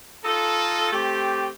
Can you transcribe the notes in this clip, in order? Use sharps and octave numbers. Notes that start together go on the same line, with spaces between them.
D#4 F4 A4
A3 C4 G4